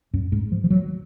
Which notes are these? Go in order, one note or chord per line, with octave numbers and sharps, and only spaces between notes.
F#2
G#2
F3
F3
F#3